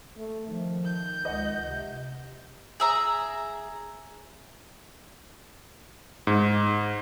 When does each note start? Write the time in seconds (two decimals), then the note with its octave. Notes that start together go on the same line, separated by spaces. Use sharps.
0.17 A3
0.48 D#3 F3
0.85 G6
1.25 C#2 D#5 F#5
1.64 C3
2.80 G#4 E5 A#5
6.27 G#2